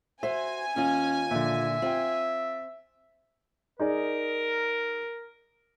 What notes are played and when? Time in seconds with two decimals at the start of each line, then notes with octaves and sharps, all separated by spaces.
0.23 F#4 C5 E5 G#5
0.76 D#2 C#4 F4
1.31 A#2 D3 E5
1.82 C4 F4 G5
3.80 D#4 G#4 A#4 D5